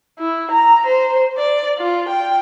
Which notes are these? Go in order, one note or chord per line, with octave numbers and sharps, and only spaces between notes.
E4
A#5
C5
D5
F4
G5